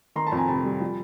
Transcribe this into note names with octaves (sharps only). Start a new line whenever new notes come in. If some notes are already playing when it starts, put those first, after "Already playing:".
D#3 A#5 C6
A5 B5
F2
G#5 A#5
C3 A5 B5
G3
F3